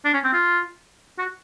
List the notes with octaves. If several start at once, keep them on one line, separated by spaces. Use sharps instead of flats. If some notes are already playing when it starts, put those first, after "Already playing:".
D4
C#4
C4
F4
F#4